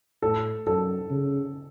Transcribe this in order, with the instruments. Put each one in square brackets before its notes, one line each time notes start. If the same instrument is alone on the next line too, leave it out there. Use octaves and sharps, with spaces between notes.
[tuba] A2 [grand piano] A4
[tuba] F#2 [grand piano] A4
[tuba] C#3